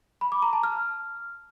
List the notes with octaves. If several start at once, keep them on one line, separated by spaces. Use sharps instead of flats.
B5
D6
A#5
A5
F6